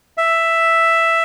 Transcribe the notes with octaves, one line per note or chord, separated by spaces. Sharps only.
E5